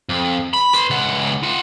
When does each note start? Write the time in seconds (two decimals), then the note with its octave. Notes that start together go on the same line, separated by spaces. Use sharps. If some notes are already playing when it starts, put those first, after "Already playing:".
0.09 F2
0.54 B5
0.74 B4 C6
0.90 C#2 F#5
1.43 F4 F#5